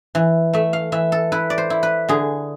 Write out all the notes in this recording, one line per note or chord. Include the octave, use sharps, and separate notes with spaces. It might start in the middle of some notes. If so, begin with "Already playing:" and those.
E3
A3 E5
F5
E3 E5
A4
E4 B4
D5
C5
E4
B4
D3 G#4